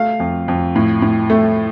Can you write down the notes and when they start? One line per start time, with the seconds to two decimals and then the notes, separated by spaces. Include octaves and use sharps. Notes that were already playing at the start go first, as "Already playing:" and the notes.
Already playing: A3 F5
0.20 F2
0.48 F2
0.76 A2
1.02 A2
1.30 A3